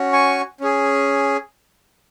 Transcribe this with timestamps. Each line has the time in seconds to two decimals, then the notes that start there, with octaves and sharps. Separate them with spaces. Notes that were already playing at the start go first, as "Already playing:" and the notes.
Already playing: C#4 F#4
0.13 G#5 C#6
0.61 C#4 G#4